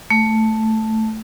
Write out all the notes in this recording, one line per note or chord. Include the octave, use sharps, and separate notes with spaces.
A3